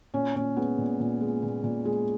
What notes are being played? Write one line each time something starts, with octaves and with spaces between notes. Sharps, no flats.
A#2 C#4
A#2 C#4
G#3 B3
A#2
A#2
G#3
A#2
A#2
G#3